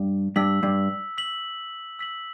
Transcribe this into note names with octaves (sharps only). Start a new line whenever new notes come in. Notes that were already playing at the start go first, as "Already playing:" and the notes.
Already playing: G2
G2 E6 B6 F#7
G2
E6 B6 F#7
E6 B6 F#7